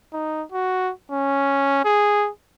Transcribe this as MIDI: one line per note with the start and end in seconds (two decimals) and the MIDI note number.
0.13 0.43 63
0.52 0.92 66
1.11 1.83 61
1.85 2.29 68